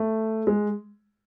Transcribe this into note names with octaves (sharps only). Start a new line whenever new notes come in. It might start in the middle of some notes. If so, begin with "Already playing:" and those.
Already playing: A3
G#3